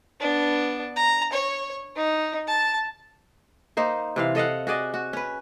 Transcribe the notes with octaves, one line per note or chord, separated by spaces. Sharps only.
B3 D4
A#5
C#5
D#4
A5
A#3 D#4 C5
C3 E3 F5
A4 D#5 F5 F#5
F#4 G#4 D5 D#5
F#4
C#4 B4